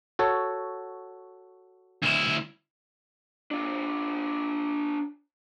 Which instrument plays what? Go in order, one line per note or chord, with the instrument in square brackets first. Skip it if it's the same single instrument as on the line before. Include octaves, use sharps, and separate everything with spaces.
[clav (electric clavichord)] F#4 A4 C#5
[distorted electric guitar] D2 E4
[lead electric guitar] D4 F4